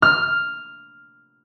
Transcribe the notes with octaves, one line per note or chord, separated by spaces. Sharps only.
F6